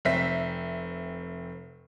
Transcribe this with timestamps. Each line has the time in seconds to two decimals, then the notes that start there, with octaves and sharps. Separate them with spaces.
0.05 F1 C4 E5 B6